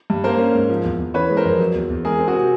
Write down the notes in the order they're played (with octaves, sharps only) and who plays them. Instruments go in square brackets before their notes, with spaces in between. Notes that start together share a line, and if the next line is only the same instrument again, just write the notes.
[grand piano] G2
[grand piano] A#3 [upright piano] A#4 C5
[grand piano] C#4
G#2
F3
E2
E2
[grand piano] E3 [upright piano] B4 C#5
[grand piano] G#3
[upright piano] A#4 C5
[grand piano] F2
F#3
E2
E2
[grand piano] G#3 [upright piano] G#4 A#4
[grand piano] C4
[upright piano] F#4 G#4
[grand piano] C3